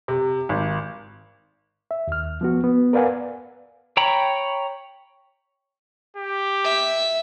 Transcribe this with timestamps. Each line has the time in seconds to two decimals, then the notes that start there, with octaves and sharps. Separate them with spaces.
0.08 C3
0.49 G#1
1.91 E5
2.07 D#2 F6
2.41 F3 B3 F#4
2.64 B3
2.93 A#4 B4 D5 F5 F#5 G#5
3.97 C#5 G5 A#5 B5
6.17 G4
6.65 E5